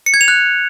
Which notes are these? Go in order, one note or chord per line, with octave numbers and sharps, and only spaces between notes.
C#7
G#6
F7
F#6